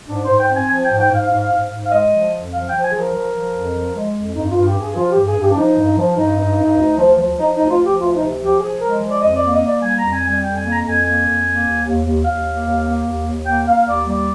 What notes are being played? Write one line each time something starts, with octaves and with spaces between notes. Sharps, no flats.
G#2 D4
G#2 C5
G5
C4
G#5
F3 G#5
G5
G#2
G5
G#2 F5
G#2
G#2
G#2
F5
G#3 D#5
F3
F2
F3 F5
G5
F3
G#5
F3 G#4
A#4
F3
F3
F2
F3
G#3
F2
G2 D#4
G2 F4
G4
G2 G#4
F3 F4
G4
G2
G#4
G2
G4
D4
F3 D#4
G2
F3
G2 D#4
G2
G2
D2
F3
F3
F3 D#4
D2 D#4
F4
F3
G4
D2 F4
C3 D#4
F3 G4
F3 G#4
G#3 A#4
F3
D5
F2 D#5
D5
A#3
D#5
A#3 D5
G3 G#5
A#5
F2
G#5
G3
G#5
F2 G5
G#5
A#3
A#5
F2
G#5
A#3 G#5
F2
A#3
D#2
D#2
D#2
D#2 F5
A#3
D#2
A#3
D#2
D#2
A#3 G5
A#3 F5
D#2 D5
G3 D5